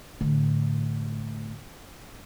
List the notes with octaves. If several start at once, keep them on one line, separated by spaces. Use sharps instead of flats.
A2 D3